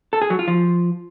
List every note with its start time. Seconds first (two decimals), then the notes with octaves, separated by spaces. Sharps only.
0.13 A4
0.22 G#4
0.30 F#3
0.39 F4
0.48 F3